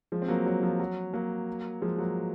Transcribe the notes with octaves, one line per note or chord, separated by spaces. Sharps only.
F3 G#3
C4
F#3 A#3
F#3
F3
F#3
F#3 A#3
F3 G#3
F#3 A#3